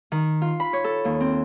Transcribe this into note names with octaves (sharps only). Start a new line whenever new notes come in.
D#3
F4
B5
C#5
A4
D#2
C4